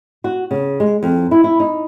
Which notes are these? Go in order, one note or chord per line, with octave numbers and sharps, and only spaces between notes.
F#4
C#3
G#3
F2
E4
E4
D#4